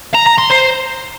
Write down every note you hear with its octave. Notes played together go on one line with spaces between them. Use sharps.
A#5
A#5
C6
C5